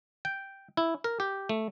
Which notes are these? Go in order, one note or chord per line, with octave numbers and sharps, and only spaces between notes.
G5
E4
A#4
G4
A3